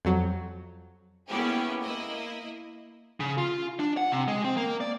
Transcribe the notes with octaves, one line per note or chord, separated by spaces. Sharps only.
F2 F#3
A#3 B3 C#4 E4 G4 G#4
A#3 E4 D#5
C#3
F4
D4
F#5
C3
G#3
C4
A#3
D5